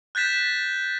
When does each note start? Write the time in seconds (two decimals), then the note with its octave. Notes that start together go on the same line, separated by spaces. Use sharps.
0.15 F#6 G6 A6 B6 E7